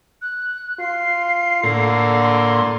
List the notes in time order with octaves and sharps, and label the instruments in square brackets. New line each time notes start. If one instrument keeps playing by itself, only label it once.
[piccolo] F#6
[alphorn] F4 [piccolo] C7
[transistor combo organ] A2 A#3 [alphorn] D3
[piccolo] C6